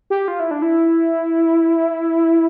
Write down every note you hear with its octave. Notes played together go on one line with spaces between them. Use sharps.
G4
F4
E4
D4
E4